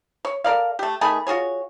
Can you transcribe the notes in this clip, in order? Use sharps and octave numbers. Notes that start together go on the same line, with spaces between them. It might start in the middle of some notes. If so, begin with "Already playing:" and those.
C#5
A4 A#4 D5 F5
A3 G4
D#3 A3 G#4 B5
F4 F#4 G#4 C#5